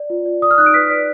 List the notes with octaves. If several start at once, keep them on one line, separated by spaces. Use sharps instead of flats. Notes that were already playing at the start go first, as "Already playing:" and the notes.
Already playing: D5
F4
D5
D5 D#6
F6
D#4 F#6
D7
B4 B6
D5